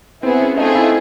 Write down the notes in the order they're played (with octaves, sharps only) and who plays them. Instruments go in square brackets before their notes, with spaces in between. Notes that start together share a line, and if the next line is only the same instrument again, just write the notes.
[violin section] B3 E4 G#4 [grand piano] C4
[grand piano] C#4
[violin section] A3 C4 F4 G#4 [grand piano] D#4
[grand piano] E4